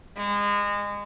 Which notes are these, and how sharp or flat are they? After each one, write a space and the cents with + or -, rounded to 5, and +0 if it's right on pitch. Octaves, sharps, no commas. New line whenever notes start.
G#3 -25